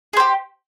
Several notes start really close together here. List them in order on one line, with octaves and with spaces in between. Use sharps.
G#4 C5 G4